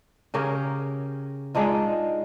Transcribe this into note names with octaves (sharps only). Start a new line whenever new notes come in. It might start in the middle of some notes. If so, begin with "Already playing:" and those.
C#3 C#4 G4 A#4
G#3 D4 D#4 F4